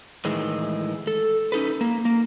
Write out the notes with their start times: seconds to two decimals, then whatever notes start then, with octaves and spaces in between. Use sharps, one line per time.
0.25 A2 D#3 E3 G#3
1.07 A4
1.52 C#4 D#4 A4 B4
1.81 A#3
2.05 A#3